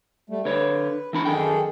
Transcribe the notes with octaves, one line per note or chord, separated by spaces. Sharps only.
G3 A3
D3 B4 C#5
E3 D4 A#4 B5
F#2 D#3 G#4 A4 G5